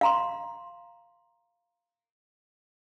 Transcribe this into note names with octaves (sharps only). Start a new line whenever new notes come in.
F5 A#5 C6